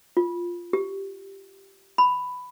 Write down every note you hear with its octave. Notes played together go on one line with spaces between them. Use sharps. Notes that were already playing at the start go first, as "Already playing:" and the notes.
F4
G4
B5